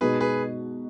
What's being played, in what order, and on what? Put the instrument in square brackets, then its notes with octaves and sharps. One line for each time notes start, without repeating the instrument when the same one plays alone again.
[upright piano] B2 G#3 D#4 F#4 [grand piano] G#4 B4
[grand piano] G#4 B4